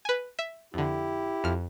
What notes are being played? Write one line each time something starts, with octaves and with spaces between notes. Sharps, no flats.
B4 G#5
E5
F2 D3 E4 G4
F2 F6